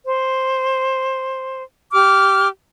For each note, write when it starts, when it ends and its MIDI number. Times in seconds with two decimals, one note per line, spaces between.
0.05 1.62 72
1.93 2.48 67
1.93 2.48 86
1.93 2.48 89